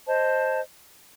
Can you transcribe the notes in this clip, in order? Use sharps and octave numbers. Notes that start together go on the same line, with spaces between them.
C5 D#5 A5